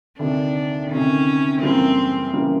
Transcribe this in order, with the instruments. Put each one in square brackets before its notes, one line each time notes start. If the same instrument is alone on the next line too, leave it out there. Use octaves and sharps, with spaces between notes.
[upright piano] D2 C3 D#3 [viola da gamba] D4
[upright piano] D2 C3 D#3 [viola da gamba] C#4
[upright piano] F#2 C#3 E3 G3 A#3 [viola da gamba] C4
[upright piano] F#2 C#3 E3 G3 A#3